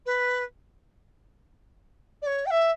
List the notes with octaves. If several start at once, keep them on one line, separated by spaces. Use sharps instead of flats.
B4
D5
C#5
G5
E5